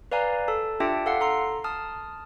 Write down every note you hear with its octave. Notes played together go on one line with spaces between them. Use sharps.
B4 D5 F5 G#5 A#5
A4 A5
D4 F4 G4 E5 G5 A5
A4 F5 F#5
A4 A#5 C6 C7
A5 D#6 F6